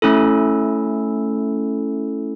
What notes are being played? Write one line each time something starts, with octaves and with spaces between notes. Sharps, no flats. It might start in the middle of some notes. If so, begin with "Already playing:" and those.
A3 C#4 E4 A4